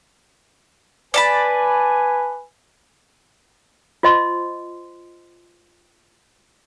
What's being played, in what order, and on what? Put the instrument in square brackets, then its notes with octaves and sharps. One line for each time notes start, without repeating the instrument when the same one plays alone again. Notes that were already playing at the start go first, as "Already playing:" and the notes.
[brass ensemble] B4 G#5 [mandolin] D5 A5 B5
[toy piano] F4 C5 D#5 C6